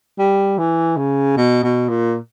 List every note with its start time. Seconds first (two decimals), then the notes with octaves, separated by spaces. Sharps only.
0.19 G3
0.58 E3
0.97 C#3
1.37 B2
1.63 B2
1.89 A#2